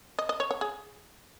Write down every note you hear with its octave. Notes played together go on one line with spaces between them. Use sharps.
D#5
D#5
C#5
C#5
G#4